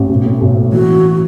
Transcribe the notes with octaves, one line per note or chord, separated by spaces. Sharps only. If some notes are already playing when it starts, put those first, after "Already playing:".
Already playing: A1
B1
A2
B1
A2
E3 F#4
E3